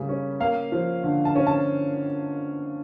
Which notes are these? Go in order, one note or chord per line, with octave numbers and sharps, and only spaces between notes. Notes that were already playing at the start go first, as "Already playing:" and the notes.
Already playing: C#3 G3 A#3
C#4
A#3 F5
F3
D3
A5
C#4
A5